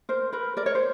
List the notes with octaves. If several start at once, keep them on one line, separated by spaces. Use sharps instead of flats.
A#4 C5
A#4 B4
A#4 D5
C#5
C5